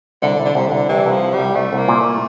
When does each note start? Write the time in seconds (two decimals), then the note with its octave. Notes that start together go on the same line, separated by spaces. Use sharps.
0.22 C2 D3
0.40 C2
0.45 D3
0.55 C2 C3
0.67 C2 D3
0.89 E3 G3
1.06 C2
1.11 F3
1.23 C3
1.33 G3
1.39 C2
1.56 C2 A3
1.73 C2
1.78 A#3
1.88 A#2
2.00 A3